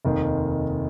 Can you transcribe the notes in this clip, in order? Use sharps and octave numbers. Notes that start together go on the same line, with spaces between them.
F1 D#2 D#3